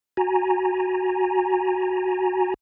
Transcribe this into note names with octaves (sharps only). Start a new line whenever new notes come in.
F#4 G#5 A#5